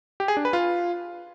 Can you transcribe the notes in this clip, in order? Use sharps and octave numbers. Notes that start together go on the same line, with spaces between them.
G4
G#4
D4
B4
F4